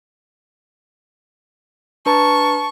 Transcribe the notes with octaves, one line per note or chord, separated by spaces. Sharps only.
D4 B4 A5 A#5 C#6